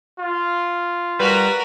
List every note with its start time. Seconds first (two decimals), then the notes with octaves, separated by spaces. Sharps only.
0.19 F4
1.20 G3 F#4 A#4 B4